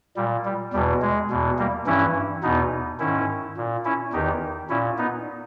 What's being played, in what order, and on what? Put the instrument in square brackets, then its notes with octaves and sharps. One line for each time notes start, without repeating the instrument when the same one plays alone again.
[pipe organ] A#2 G3
G3
E2 B2 G3
G#3
E2 B2
G3 A#3
G2 E3 C#4 E4
E2 B2 B3 D#4
G#2 D#3 C#4 E4
A#2
C#4 E4
E2 D#3 D#4 G4
A#2 C#4 E4
B3 D#4